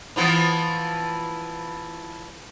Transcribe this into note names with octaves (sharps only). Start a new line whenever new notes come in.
E3 F3 B3